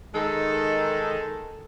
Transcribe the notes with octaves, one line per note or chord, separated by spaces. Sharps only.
D#3 G#3 A4